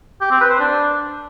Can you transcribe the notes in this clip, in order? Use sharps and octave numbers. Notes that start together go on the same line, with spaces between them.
G4
C4
B4
C5
D4